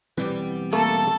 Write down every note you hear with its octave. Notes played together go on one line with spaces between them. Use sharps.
B1 E3 G3 B3 C4
A3 A#3 A4